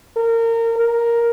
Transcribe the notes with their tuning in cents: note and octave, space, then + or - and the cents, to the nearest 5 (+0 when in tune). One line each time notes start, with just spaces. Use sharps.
A#4 -25
A#4 +5